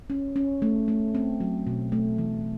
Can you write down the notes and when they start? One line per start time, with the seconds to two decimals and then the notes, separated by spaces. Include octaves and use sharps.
0.10 C#4
0.36 C#4
0.62 A3
0.88 A3
1.15 C4
1.40 F#3
1.67 B2
1.92 A3
2.18 E3